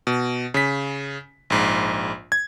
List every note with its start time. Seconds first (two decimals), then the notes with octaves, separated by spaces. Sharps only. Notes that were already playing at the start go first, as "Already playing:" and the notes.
0.07 B2
0.54 C#3 B6
1.50 A#1 G#2
2.32 G#6